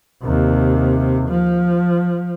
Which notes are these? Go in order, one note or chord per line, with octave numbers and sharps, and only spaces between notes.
D#2 C3
F3